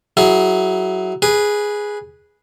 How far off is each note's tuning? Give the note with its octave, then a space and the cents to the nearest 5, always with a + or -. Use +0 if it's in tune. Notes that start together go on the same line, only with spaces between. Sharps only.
F#3 +15 E4 +0 G#4 +25
G#4 +0 B4 -15